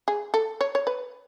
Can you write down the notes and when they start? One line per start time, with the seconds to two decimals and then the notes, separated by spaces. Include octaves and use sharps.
0.08 G#4
0.34 A4
0.61 C#5
0.75 C#5
0.87 B4